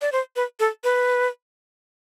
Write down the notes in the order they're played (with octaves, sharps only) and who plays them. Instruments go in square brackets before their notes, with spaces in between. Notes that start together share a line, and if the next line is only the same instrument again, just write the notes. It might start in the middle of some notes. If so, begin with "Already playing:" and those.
[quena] D5
C5
B4
A4
B4